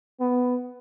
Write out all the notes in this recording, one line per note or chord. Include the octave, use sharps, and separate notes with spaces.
B3